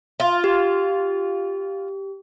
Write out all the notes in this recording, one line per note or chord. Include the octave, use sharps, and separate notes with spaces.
F4
G4